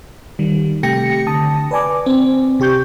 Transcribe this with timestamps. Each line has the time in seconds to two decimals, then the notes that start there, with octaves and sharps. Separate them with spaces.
0.39 D#3 G3
0.83 C3 A3 G4 G5 A#6 C#7
1.27 D3 A5 D#6
1.71 B4 D5 G#5 D6
2.06 C4
2.60 C3 G4 C#6 G6